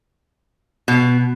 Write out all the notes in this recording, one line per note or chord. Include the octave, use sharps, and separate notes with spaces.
B2